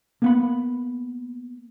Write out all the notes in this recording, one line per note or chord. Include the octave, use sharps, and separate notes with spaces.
A#3 B3 B5